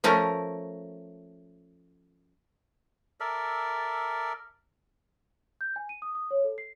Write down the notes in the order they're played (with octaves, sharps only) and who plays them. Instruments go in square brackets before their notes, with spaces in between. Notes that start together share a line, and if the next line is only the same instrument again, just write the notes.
[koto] F3 A3 C#4 A#4
[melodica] A4 A#4 D5 E5
[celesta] G6
G#5
D#7
D#6
D#6
C#5
A4
C7